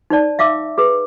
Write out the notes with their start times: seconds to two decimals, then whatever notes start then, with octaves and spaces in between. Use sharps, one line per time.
0.10 D#4 C5 D5 A5
0.39 E5 F5 D6 E6
0.78 G#4 B4